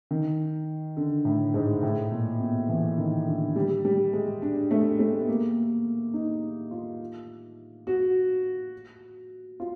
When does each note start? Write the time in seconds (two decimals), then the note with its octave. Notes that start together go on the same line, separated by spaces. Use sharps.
0.11 D#3
0.97 D3
1.25 A2
1.54 G#2
1.83 A2
2.12 A#2
2.40 B2
2.69 E3
2.98 D#3
3.27 D3
3.56 G3
3.85 G3
4.13 G#3
4.42 D4
4.71 A3
4.99 A3
5.19 B3
5.28 A#3
6.14 D#4
6.71 F4
7.87 F#4
9.60 F4